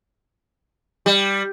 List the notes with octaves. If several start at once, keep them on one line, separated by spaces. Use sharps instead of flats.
G3